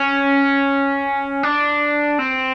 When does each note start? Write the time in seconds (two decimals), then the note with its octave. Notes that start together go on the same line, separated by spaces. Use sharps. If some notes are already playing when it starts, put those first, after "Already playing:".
Already playing: C#4
1.43 D4
2.19 C4